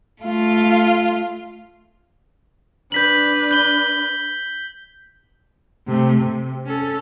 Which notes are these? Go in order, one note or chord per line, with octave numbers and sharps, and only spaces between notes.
A3 F4
D4 B4 G6 B6 F#7
G6 G7
C3 A3
C3
C#4 A4